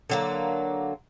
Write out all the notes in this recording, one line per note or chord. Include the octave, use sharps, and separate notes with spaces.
D3 F#3 A#3